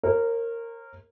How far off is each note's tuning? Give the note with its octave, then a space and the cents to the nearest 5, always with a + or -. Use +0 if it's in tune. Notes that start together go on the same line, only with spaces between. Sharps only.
A#4 -15 C#5 -45